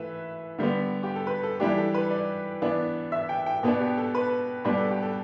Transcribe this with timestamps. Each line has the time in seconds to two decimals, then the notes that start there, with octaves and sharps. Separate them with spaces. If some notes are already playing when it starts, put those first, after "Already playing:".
Already playing: E3 A3 B4 E5
0.58 D3 G3 B3
1.03 G4
1.16 A4
1.27 B4
1.43 A4
1.60 E3 G3 D4 G4
1.78 A4
1.94 B4
2.11 D5
2.62 E3 B3 D4
3.12 E5
3.29 G5
3.46 G5
3.63 B2 B3 D4
3.80 G4
3.98 A4
4.15 B4
4.65 B2 G3 D4 B4
4.78 A4
4.90 G4
5.02 A4